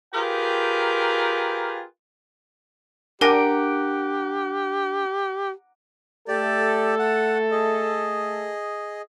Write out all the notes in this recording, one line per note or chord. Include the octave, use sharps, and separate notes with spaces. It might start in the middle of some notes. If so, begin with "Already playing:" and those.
F4 G4 G#4 A#4 B4 G5
D4 G4 A#4 F#5 G#5 A#5 D6 A#6
A3 G4 A4 D5
F#5
G#4 D#5